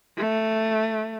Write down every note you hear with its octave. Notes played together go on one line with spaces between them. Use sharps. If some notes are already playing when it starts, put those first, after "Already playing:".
A3